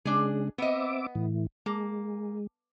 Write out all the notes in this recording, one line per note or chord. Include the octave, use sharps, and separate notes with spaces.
C#3 G#3 D4 G#4
B3 C4 D#5 E5 D6
A2 E3
G#3 A#3